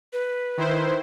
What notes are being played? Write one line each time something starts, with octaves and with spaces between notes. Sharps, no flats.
B4
D#3 E4 C5